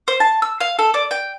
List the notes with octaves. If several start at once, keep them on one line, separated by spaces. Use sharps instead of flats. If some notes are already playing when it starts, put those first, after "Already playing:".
C5
A5
E6
F5
A4
D5
G5